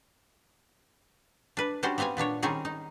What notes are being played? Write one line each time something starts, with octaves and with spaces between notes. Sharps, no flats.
D4 B4
G3 C#4 D4 F#4 G4 C5
G3 B3 C4 F5 G#5
A#2 B3 D4 C#5
D#3 G3 C4 C#4 D#4 G#4
D#4